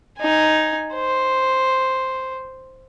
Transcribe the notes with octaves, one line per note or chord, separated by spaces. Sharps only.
D#4 G#5
C5